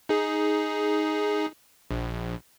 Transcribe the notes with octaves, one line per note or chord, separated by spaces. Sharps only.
D#4 G#4
A#1